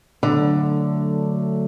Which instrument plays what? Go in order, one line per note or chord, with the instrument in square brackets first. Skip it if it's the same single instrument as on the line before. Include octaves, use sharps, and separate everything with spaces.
[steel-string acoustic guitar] D3 [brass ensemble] F#3 A3 D4